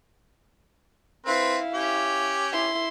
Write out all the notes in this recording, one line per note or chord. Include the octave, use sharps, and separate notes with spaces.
C4 E4 B4 F5
C#4 G4
E4 C6